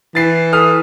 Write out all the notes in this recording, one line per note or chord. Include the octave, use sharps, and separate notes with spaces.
E3 A6 C7
A4 D#6 F6